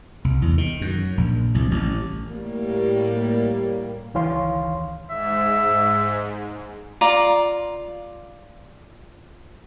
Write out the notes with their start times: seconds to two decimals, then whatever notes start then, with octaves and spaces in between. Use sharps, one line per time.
0.24 C2
0.42 E2
0.58 D#3
0.81 F#2
1.18 A#1
1.55 C2
1.71 A1
2.29 A2 G3 A#3
4.14 C#2 D#3 E3 C#5 F5 C6
5.10 G#2 E5
7.01 F4 D5 A#5 C6